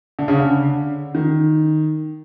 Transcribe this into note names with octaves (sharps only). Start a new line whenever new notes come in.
D3
C#3
D3
D#3